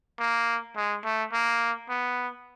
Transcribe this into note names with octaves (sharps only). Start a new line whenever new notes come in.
A#3
G#3
A3
A#3
B3